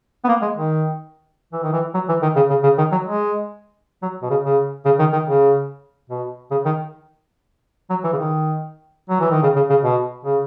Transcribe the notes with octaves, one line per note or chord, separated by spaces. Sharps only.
B3
A#3
G#3
D#3
E3
D#3
E3
F#3
E3
D#3
C#3
C#3
C#3
D#3
F#3
G#3
F#3
B2
C#3
C#3
C#3
D#3
D#3
C#3
B2
C#3
D#3
F#3
E3
C#3
D#3
F#3
E3
D#3
C#3
C#3
C#3
B2
C#3